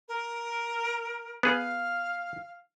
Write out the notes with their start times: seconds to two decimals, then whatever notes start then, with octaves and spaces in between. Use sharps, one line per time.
0.08 A#4
1.43 B3 G#4 F5